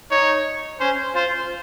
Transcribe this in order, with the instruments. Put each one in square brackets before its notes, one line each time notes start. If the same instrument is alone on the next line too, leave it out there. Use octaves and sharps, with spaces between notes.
[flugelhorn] D#4 [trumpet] C#5
[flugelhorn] C#4 [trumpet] C5
[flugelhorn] F4 [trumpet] C5